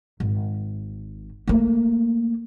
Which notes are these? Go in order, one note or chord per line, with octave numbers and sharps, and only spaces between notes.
G#1
A3 A#3